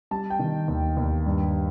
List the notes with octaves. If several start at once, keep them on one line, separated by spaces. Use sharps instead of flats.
G3 A5
G5
D#3
D#2
D#2
G2